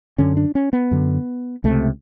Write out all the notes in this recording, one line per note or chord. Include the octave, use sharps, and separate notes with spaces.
F#2 D3 C#4
D4
C#4
B3
F#2 D3
C#2 C3 A3